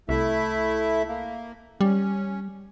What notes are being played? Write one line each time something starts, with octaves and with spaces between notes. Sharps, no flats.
C2 A3 E4 E5
A#3
G3 C#4